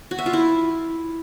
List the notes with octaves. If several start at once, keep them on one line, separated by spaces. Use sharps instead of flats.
F#4
E5
F4
E4